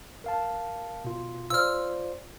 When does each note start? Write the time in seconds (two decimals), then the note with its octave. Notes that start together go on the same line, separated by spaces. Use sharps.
0.24 A#4 F5 A5
1.05 B2 F4
1.50 F4 C5 D5 E6 F6